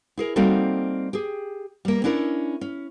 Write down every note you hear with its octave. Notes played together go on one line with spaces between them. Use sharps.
E4 G#4 A#4
G3 A#3 C4 D#4 F#4 A4
G4 G#4
G3 A#3
C#4 D4 E4 A#4
C#4